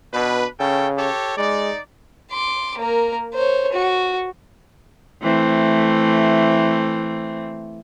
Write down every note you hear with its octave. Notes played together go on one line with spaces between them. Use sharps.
B2 D4 B4
C#3 C#4 A4 G5
G4 A4 C#5
G#3 D#4 D5
C6 D6
A#3 A#4
C5 C#5
F#4
E3 A3 C4